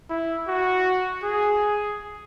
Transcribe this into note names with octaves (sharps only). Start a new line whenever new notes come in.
E4
F#4
G#4